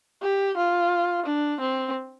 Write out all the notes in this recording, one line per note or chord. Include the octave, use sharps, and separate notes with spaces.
G4
F4
D4
C4